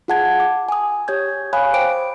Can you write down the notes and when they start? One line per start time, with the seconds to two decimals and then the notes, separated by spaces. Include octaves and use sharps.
0.08 F4 G#4 F#5 A5 G#6
0.40 D6
0.69 G#5 D#6
1.08 G4 C#5 G6 G#6
1.53 C#5 F5 G#5 B5 D#6 F#6
1.74 C5 G5 D6 D7